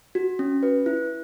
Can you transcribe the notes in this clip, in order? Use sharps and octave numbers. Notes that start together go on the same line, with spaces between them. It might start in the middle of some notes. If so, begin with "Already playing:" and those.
F#4
C#4
B4
E4